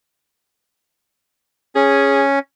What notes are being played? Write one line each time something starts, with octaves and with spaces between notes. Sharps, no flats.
C#4 G#4